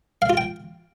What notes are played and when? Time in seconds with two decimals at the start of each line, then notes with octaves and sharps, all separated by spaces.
0.22 F5
0.30 F4
0.37 G5